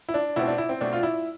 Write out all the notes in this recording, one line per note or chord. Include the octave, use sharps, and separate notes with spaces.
E4
D4
B2 A3 C4 E4
D4
E4
C4
B2 A3 C4 D4
F4
E4